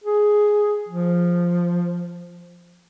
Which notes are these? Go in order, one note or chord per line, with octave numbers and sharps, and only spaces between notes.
G#4
F3